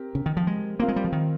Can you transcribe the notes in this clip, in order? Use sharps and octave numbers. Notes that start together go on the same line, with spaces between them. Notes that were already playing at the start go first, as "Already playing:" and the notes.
Already playing: C4 G4 A#4
C#3
D#3
F3
G#3
A#3 C4 F4 A#4 F5
G#3
G3
F3
D#3